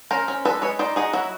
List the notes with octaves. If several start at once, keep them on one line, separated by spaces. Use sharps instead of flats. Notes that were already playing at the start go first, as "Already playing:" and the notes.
C#4 A#4 C5
C#4
G#3 A4 B4
G#3 B4 C#5
D#4 C5 D5
D#4 F#4 G#4
F#3 E4 F#4